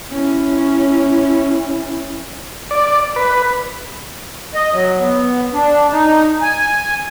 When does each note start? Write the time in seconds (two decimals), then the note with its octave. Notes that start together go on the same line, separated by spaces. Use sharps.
0.12 C#4 E4
2.71 D5
3.16 B4
4.55 D#5
4.73 F#3
5.00 B3
5.53 D4
5.92 D#4
6.41 G#5